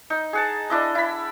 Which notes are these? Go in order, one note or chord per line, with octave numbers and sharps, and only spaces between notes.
D#4
G#4 F#5 A5
D4 E4 D#5
E4 B5